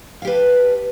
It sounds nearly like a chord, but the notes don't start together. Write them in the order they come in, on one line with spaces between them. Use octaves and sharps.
F5 G4 B4 A5